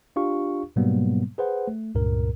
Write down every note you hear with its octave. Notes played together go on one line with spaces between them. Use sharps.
D4 F4 G4 F5 C#6
G#2 B2 F#3 G3 A#3 B3
G#4 B4 C5 F#5
A3
C#2 G2 A#2 A#4